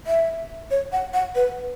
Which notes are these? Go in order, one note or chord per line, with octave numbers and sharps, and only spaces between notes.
E5
C#5
F#5
F#5
B4